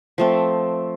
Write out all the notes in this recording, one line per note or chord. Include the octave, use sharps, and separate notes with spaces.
F3 A3 C4